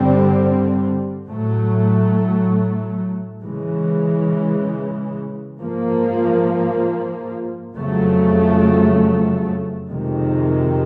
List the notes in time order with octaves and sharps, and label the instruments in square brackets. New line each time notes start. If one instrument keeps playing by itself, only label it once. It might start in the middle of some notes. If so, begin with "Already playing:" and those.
Already playing: [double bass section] G2 D3 G3 C4
A2 F#3 A3
C#3 E3 G#3
G#2 F3 A#3
F2 C#3 F#3 A3
F2 C3 D#3 G#3